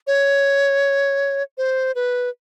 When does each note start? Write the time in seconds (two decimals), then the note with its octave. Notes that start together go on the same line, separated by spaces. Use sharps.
0.07 C#5
1.58 C5
1.95 B4